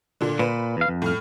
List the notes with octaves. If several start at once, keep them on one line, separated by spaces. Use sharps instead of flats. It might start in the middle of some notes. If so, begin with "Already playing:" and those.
A#2 D3
A#2 B4
E2 F5
F2
A2 F6